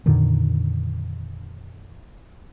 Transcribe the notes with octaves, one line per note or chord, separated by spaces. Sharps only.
F2 A#2 D3 D#3